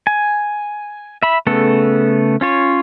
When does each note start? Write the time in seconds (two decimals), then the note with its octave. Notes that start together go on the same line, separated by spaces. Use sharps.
0.07 G#5
1.23 E5 B5
1.47 C#3 A3 B3 A4
2.41 C#4 F4 C#5